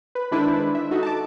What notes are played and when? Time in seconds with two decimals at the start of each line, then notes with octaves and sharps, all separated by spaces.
0.15 B4
0.31 D#3 G#3 D4 E4 B4 C5
0.75 E5
0.91 D#4 F#4 A4
1.03 A5 D6